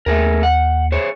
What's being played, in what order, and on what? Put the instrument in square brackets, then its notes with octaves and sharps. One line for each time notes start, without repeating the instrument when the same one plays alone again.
[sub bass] D#2 [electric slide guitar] A3 G#4 A#4
[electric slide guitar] F#5
G#4 C5 C#5